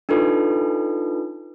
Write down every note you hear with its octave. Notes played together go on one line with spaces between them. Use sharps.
D4 D#4 F4 A4 B4